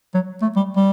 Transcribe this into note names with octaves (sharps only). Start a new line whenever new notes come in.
F#3
A3
G3
G3